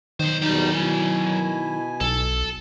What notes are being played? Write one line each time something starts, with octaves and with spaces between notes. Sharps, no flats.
B1 D#3 C5
E2 B2 F#3 G3 D#4 G5
B2 E4 G#5
B1 A4